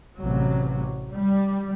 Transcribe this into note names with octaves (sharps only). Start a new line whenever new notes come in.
A1 C3 F#3
G3